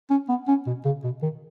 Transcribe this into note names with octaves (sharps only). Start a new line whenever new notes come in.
C#4
B3
C#4
B2
C#3
B2
D#3